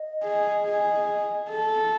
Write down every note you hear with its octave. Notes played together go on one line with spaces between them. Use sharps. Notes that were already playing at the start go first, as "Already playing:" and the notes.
Already playing: D#5
G#4
G#4
A4